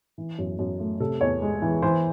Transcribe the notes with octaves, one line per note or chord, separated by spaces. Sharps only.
E3
F#2
F#2
A3
C3 A4
E2 C#5
G#3
E3
E3 C5